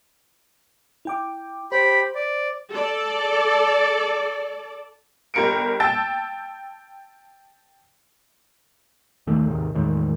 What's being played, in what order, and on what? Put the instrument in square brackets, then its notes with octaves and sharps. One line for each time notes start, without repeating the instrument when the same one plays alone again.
[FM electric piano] E4 G5 D6
[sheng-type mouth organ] G4 B5 [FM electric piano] C5
[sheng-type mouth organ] D5
[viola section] A4 D5
[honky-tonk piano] G1 G4 A#4 C#7 D7
G5 A5 E6 A6
[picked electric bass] D#2 D#3 A3
D#2 G#2 C3 D#3
E2 A2 D#3 G#3